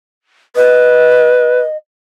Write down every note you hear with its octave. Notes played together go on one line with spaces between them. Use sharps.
B4 D#5